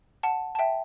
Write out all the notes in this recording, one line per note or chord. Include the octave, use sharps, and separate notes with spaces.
F#5 A5
A5
E5 G5